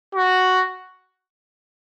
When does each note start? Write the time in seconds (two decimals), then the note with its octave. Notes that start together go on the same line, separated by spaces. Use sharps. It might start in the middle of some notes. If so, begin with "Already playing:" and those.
0.15 F#4